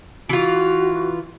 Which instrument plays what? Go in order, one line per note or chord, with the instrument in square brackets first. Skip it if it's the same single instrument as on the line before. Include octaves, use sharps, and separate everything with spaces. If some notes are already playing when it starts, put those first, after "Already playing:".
[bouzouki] E3 F4 [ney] F#4